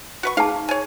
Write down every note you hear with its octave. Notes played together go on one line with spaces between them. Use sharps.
F#4 B4 C#6
D#4 G#4 F5 A5
C#5 G#5